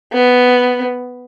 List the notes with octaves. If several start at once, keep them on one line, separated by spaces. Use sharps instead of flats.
B3